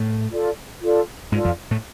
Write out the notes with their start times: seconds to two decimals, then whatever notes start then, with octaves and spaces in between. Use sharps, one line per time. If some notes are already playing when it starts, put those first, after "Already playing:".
Already playing: A2 A3
0.31 F4 A4 D5
0.82 F4 A4 D5
1.32 G#2 G#3 F4 A4 D5
1.45 F2 F3
1.71 A2 A3